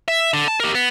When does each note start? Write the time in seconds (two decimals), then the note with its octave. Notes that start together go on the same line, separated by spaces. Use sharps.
0.08 E5
0.34 D3
0.48 A5
0.60 G4 A#4
0.75 B3